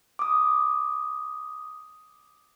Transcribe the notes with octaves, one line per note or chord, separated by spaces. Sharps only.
D6 D#6